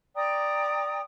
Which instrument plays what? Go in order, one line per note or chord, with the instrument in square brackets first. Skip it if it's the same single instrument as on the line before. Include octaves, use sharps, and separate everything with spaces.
[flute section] D5 G5 A#5 D#6